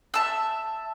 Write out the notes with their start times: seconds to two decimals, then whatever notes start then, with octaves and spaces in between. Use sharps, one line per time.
0.14 E5 A5 E6